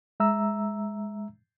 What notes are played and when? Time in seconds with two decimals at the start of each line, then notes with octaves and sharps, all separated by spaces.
0.20 G#3 E5 A#5 E6